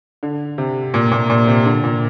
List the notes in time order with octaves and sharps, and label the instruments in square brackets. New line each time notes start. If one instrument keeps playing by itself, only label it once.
[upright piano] D3
C3
A#2
A#2
A#2
C3
D3
A#2